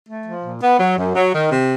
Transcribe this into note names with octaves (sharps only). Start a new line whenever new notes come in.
A3
F3
A#2
B3
F#3
F#2
F#3
D#3
C3